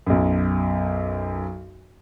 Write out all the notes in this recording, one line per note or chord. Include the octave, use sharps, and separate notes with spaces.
B1 F#2